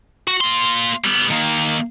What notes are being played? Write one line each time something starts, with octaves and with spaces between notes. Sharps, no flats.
F#4
A#3 C6
G3 B3
D#3 A#3